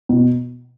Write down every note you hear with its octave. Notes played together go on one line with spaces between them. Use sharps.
B2